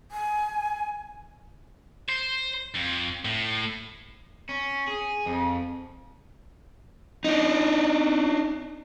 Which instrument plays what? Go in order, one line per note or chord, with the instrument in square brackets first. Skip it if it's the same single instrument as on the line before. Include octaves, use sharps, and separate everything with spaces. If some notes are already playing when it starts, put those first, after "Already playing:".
[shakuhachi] G#5
[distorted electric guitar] C5
F2
A2
[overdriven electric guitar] C#4
G#4
F2
[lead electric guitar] D4 D#4